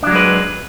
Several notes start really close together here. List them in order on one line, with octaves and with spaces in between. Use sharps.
D4 F#3 G#3 B4